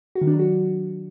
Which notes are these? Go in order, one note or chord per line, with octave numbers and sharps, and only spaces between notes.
F#4
D#3
D4
F#3
F#4